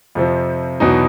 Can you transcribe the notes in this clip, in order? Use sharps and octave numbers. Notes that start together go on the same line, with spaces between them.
F2 C3 F3
E2 B2 F#3 B3 D#4